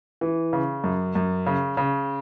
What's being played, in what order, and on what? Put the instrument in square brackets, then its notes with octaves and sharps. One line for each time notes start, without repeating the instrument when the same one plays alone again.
[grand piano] E3
C#3
F#2
F#2
C#3
C#3